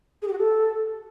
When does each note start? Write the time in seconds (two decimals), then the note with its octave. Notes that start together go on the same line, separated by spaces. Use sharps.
0.22 G#4
0.28 G4
0.33 F#4
0.38 A4